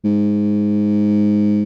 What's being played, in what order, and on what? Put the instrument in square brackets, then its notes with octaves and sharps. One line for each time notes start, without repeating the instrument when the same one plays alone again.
[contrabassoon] G#2